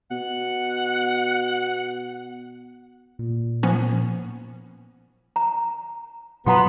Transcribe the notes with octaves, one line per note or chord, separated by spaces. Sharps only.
B2 F#5
A#2
F3 B3 C#4
A#5
B2 F#3 B3 F4 F#5 A#5 C6